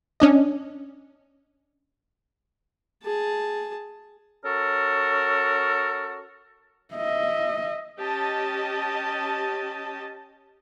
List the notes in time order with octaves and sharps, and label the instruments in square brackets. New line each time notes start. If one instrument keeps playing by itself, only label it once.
[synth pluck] C#4 D4 D#5
[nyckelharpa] G#4 A5
[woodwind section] C#4 F#4 A4 A#4
[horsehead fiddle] D#5 E5
[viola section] C#4 G4 D#5 A5